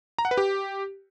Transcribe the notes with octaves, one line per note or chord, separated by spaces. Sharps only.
A#5
F#5
B4
G4